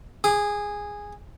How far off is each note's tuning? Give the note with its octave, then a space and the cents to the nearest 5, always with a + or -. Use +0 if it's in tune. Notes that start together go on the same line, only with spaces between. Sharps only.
G#4 -10 D6 +40